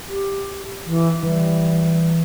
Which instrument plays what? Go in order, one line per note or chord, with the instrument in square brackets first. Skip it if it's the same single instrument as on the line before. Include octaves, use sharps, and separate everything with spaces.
[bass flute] G4
E3
[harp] E3 [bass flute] G3